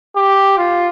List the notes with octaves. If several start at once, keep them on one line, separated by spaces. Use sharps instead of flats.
G4
F4